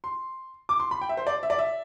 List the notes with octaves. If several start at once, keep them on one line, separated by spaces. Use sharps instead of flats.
C6
D6
C6
B5
G5
E5
C5
D5
E5
D5
E5